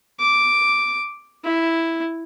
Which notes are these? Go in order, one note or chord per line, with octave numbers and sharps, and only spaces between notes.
D6
E4